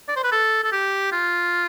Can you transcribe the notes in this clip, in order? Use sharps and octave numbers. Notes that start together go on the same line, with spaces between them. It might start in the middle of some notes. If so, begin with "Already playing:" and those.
D5
C5
B4
A4
A4
G4
F4